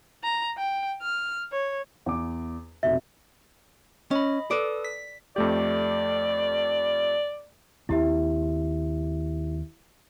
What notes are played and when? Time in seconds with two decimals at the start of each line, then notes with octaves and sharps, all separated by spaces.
0.24 A#5
0.58 G5
1.02 F6
1.52 C#5
2.06 E2 D6
2.83 F1 B2 E5
4.11 C#4 D#5 B5
4.51 A4 B4 D5 D#6
4.85 B6
5.36 F2 A3 G4 D5
7.89 D#2 C4 E4 G4 E5